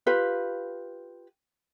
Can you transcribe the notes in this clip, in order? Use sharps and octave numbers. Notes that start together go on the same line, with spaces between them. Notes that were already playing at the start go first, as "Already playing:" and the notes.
F4 G4 B4